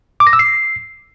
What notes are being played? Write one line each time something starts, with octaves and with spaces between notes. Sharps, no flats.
D6
A#6
E6
C7